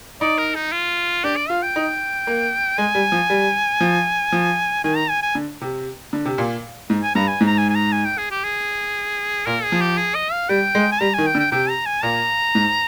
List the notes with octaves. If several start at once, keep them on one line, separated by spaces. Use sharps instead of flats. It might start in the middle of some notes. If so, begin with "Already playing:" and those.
D#4 D5
A#4
D#4
F4
D4 G4
D5
F4 F5
G5
D#4
A#3
G#3 G#5
G3
F3
G3
F3
F3
D#3 G#5
A#5
G#5
G#5
D3
C3
D3
C3
A#2
G#2
G#5
G2 A#5
G#5
G#2
A#5
G#5
G#5
A#5
G#5
G5
G#4
G4
G#4
A#2 A#4
G#4
F3
G4
G#4
D#5
F5
G3 G5
G#3
G#5
G3 A#5
D#3 G#5
G5
D3
G5
C3 G5
A#5
G#5
A#2 A#5
G#2